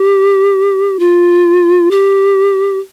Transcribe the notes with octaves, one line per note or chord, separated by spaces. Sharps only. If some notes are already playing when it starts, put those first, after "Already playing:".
Already playing: G4
F4
G4